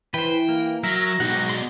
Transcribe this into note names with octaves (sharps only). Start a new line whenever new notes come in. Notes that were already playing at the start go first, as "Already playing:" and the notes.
E3 B4 C5 G5
A#3
F#3 A#4 E5 A#6
G#2 B2 F#3 F#5 G5
D5 C6